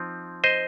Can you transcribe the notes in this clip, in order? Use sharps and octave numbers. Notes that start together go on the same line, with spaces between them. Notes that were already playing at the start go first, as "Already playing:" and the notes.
Already playing: F3 C4 D#4
C5 D#5